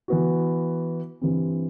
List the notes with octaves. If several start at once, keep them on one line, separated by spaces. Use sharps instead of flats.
E3 B3 F#4
G2 E3 G3 C4